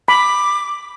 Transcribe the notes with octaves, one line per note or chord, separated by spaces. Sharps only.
B5 D6